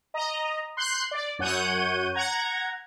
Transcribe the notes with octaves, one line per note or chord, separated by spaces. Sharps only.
D#5 A#5
C6 F#6 G6 C7
D5
F#2 C#5 F#5 G6 D#7
F#5 A#5 G#6